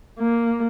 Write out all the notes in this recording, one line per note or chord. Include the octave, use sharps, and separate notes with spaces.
A#3